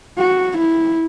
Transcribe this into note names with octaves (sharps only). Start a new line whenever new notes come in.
F#4
E4